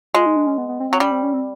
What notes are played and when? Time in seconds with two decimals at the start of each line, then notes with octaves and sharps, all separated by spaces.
0.14 G#3 F4
0.26 D#4
0.36 D4
0.47 C#4
0.58 B3
0.68 B3
0.80 C4
0.90 F#3 C4
1.00 G3 C#4
1.11 C4
1.23 C#4
1.33 C4